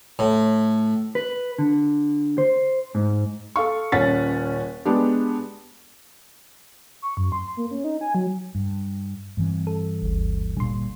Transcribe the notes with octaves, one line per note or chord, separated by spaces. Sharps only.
A2
B4
D3
C5
G#2
A4 F5 C#6
D#1 C#4 F#5 A6 B6
G#3 B3 D4 G4
C#6
F#2
C6
A#3
C#4
D#4
G#5
F#3
G2
G2 E3 C4
A4
G1 D2
A#2 D3 G3 C6